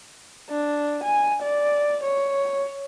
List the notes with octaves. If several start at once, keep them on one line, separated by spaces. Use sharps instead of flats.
D4
G#5
D5
C#5